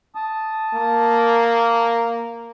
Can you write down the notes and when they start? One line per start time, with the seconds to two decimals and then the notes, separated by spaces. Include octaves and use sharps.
0.15 A5 D#6
0.74 A#3